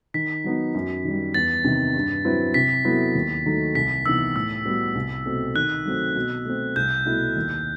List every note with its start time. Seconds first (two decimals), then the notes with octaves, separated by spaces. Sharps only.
0.14 D#3 B6
0.44 F#3 B3 D#4
0.74 F#2
1.04 D#3 G3
1.34 E2 A6
1.64 C3 D#3
1.95 G2
2.25 F#3 C4 E4 B4
2.54 C3 B6
2.85 F#3 B3 E4 A4
3.15 D#2
3.46 D#3 F#3 A3 D#4
3.75 C2 B6
4.05 C3 E3 B3 D#4 E6
4.35 A2 E6
4.65 G3 B3 F#4
4.95 C2
5.25 B2 A3 C4
5.55 D#3 F#6
5.85 F#3 A3 C4
6.16 B2
6.45 A3 C4
6.76 C2 G6
7.05 B2 A3 E4
7.37 D#2